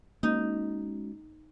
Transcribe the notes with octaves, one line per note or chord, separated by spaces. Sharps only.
G#3 A#3 C#4 D#4 F#4